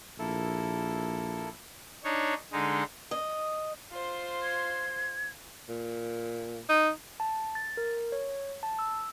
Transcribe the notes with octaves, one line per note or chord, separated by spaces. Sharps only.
A#1 A#3 E4 A4
D4 D#4 C#5
D3 G#3 D#4
D#5
F4 C5
G#6
A#2
D#4
A5
A6
A#4
C#5
A5
E6